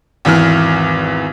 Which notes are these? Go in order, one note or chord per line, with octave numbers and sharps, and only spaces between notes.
G#1 E2 E3 F6